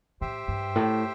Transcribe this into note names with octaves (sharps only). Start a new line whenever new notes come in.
A2 G4 C5 E5 G5
G2
A2